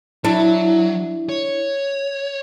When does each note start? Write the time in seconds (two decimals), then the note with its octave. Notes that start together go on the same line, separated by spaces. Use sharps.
0.24 F#3 D4 E4
1.29 C#5